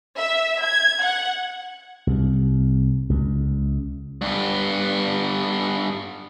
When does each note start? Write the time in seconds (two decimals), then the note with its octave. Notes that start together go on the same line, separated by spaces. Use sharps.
0.18 E5
0.63 G#6
1.01 F#5
2.07 C2
3.10 C#2
4.21 G2 B3